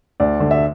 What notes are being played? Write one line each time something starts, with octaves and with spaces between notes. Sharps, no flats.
D2 D5
D3
E5